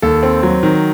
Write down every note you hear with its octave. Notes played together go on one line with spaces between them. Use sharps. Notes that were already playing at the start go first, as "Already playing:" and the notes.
D#2 A4
C4
F#3
D#3